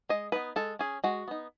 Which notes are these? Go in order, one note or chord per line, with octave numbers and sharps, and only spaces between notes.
G#3 D#5
B3 D#4 B4
G#3 A4
C#4 G#4
G#3 F#4
B3 D#4